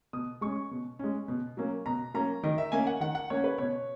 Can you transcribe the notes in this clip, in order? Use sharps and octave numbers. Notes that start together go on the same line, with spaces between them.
B2 D#6
G#3 C#4 C#6
B2
G#3 C#4
B2
F#3 A#3 C#4
B2 A#5
F#3 A#3 C#4 A#5
D#3 D#5
E5
A#3 C#4 G#5
F#5
D#3 F#5
F#5
A#3 C#4 C#5
B4
B2 C#5